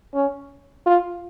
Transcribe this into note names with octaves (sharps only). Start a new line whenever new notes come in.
C#4
F4